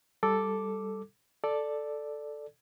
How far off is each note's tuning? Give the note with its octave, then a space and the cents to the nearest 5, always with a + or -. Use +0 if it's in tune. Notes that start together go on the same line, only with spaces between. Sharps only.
G3 +0 A4 +0 D6 +0
A4 +0 D5 +5